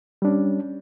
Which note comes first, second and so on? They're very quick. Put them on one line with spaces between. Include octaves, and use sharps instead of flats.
G3 D4 C#4